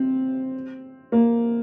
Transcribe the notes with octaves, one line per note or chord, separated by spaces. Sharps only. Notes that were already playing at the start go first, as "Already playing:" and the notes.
Already playing: C4
A#3